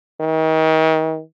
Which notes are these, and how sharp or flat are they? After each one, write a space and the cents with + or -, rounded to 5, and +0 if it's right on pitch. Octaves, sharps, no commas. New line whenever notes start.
D#3 +35